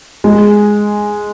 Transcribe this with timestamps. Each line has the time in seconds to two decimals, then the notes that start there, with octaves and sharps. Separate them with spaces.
0.24 G#3